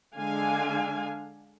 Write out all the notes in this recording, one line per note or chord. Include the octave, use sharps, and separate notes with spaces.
D3 G#3 D4 F5 G#5